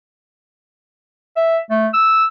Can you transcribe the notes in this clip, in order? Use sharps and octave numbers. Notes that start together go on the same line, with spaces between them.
E5
A3
E6